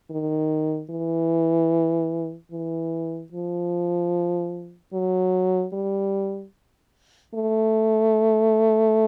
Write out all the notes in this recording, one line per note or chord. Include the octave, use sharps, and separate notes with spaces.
D#3
E3
E3
F3
F#3
G3
A3